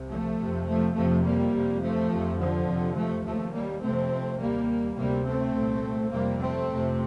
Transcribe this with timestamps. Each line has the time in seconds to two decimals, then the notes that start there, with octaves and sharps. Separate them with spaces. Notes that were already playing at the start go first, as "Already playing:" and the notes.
Already playing: C2 C3
0.09 F3 A3
0.39 F2 C3
0.67 F3 A3
0.95 F2 C3 F3 A3
1.24 G3 A#3
1.54 F2 C3
1.82 F3 A3
2.10 F2 C3
2.39 D3 F3
2.67 F2 C3
2.96 F3 A3
3.25 D#2 F3 A3
3.53 G3 A#3
3.82 F2 C3 A3 C4
4.39 D#2 G3 A#3
4.96 D2 C3 G3 A#3
5.25 A3 C4
5.55 C2 A#2
6.11 F2 C3 G3 A#3
6.41 A3 C4
6.69 F2 C3